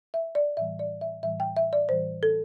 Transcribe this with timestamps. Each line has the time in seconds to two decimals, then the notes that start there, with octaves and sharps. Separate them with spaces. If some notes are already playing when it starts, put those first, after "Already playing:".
0.14 E5
0.35 D5
0.57 A2 E3 G3 E5
0.79 D5
1.01 E5
1.23 A2 E3 G3 E5
1.40 G5
1.57 E5
1.73 D5
1.89 A2 E3 G3 C5
2.23 A4